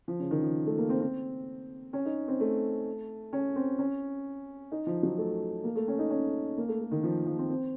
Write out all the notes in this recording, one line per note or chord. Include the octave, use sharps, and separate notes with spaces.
F3
C#3
D#3
F3
A3
A#3
C4
C4
C#4
D#4
C4
A3
C#4
C4
C#4
D#4
F3
F#3
A3
A#3
A3
C#4
D#4
C#4
A#3
A3
A3
D#3
F3
F3
C4
C4